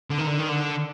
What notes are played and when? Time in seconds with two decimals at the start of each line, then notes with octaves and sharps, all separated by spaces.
0.10 D3
0.18 D#3
0.27 D3
0.39 D#3
0.49 D3